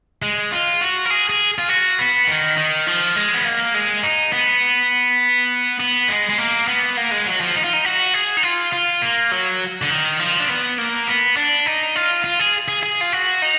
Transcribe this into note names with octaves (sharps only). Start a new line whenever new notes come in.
G#3
F4
F#4
A#4
G#4
G#4
F4
F#4
B3
D#3
D#3
F3
G#3
B3
A#3
G#3
D#4
B3
B3
G#3
G#3
A#3
B3
A#3
G#3
F#3
F3
D#4
F4
D#4
F#4
G#4
D#4
F4
F4
A#3
F#3
D3
D#3
F3
D4
B3
A#3
B3
D4
D#4
F4
F4
G#4
G#4
G#4
F4
F#4
D#4